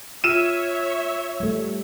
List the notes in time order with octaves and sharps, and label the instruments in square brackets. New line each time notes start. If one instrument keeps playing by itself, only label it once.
[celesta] F4 E6 F6 [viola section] C#5 E5 [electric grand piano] D#7 E7
[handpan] G3 A3